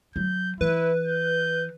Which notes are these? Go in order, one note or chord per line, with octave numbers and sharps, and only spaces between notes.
F#3 G6
E3 E4 B4
G6